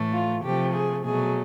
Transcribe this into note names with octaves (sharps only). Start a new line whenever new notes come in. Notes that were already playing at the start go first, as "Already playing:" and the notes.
Already playing: A2 E3 A3
F4
C3 F3 A3 G4
G#4
B2 F#3 A3 G#4